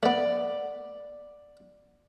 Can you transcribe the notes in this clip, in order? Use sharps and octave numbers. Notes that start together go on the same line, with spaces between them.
A3 B3 D5